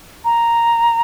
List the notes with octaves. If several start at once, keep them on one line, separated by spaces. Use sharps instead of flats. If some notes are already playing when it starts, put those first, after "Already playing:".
A#5